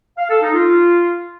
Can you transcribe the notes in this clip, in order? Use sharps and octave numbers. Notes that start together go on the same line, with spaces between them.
F5
A4
D#4
F4